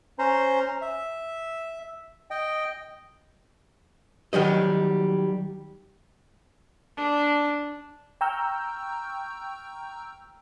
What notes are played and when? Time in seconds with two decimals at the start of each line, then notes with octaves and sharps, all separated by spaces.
0.19 C#4 C5 A#5 C6
0.82 E5
2.31 D#5 G5
4.33 D#3 F#3 G3 D#5
6.97 D4
8.21 G5 A#5 C#6 E6 F6 G6